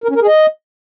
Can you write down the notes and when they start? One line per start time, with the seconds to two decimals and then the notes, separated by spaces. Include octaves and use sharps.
0.04 A#4
0.10 C#4
0.16 A#4
0.22 G#4
0.27 D#5